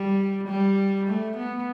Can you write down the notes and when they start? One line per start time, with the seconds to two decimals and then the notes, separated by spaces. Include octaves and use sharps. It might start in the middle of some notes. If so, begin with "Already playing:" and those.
Already playing: G3
0.48 G3
1.08 A3
1.37 B3